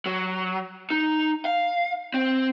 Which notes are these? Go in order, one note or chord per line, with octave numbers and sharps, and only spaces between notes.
F#3
D#4
F5
C4